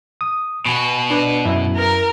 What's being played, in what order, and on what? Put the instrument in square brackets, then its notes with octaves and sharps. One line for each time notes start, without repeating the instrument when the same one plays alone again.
[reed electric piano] D#6
[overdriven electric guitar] B2 F#4 [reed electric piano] G#5 B5 C#6
[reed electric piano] D4 B4 D5
F#2 E4
[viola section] A#4